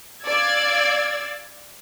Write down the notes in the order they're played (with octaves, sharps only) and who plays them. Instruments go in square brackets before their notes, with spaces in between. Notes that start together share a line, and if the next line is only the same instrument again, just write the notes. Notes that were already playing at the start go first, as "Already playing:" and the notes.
[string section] D5 F5 E6 G#6 A6